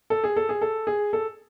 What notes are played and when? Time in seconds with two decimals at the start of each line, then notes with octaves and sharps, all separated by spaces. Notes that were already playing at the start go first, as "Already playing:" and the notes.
0.10 A4
0.24 G#4
0.36 A4
0.49 G#4
0.62 A4
0.87 G#4
1.13 A4